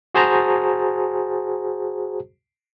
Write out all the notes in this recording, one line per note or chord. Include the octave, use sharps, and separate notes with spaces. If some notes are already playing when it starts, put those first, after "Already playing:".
F#4 G#4 C5 A5 A#5